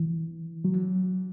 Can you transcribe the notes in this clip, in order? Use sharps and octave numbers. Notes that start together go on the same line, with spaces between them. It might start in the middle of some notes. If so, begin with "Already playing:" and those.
Already playing: E3
F#3